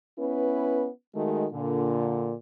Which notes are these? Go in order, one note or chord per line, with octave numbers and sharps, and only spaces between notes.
B3 C#4 E4 B4
D#3 G#3 A3 F#4
A#2 D3